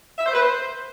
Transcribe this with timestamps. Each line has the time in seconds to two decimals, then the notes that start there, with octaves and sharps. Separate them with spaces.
0.18 E5
0.26 C5
0.34 B4
0.41 C5